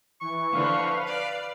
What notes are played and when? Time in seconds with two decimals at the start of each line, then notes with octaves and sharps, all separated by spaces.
0.21 E3 C#6
0.51 D3 E3 F3 B4 F5
1.06 D5